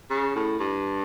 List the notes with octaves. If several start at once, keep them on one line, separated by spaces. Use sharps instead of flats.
C#3
A2
G2